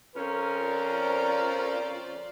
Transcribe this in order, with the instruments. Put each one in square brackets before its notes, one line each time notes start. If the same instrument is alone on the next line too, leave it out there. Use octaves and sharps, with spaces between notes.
[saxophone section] F2 C#4 [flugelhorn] A#4
[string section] F4 C5 D5